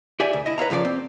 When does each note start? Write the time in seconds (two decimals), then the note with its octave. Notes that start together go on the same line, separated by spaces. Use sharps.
0.20 G4 D5 E5 G#5
0.33 D2
0.46 E4 D#5
0.58 B4 C#5 F5 A#5
0.70 F2 C#3 F3 G4 D5
0.85 C4